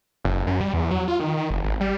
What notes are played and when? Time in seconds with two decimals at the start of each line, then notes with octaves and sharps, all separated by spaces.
0.25 F#1
0.47 F#2
0.61 G3
0.74 E2
0.91 F#3
1.08 F4
1.20 D#3
1.37 D#3
1.50 F#1
1.64 G#1
1.80 G3